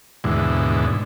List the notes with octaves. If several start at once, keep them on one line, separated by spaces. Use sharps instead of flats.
D#2 G#2 B2 D3 E3